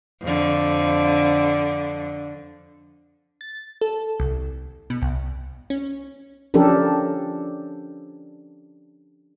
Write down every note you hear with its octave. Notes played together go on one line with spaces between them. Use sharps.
F2 D3
A6
A4
C2
B2
C2
C#4
F3 C#4 D4 G4 A4 A#4